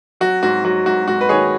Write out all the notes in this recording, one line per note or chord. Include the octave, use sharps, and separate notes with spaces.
F#3 F#4
G#2 F#4
F#3 F#4
G#2 F#4
G#2 F#4
B4
D#3 G#4 C#5